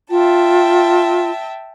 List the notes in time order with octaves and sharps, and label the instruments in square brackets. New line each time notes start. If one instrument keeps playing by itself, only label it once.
[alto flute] F4 [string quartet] E5 G5 A5